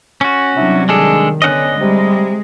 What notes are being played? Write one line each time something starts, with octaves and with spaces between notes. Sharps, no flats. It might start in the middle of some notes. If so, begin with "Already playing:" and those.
C#4 F#4
C3 F#3 G3 D4 E4
D#3 G#3 D4 G#4 A4
D3 B3 C#4 D#5 F#5 F#6
C3 G3 G#3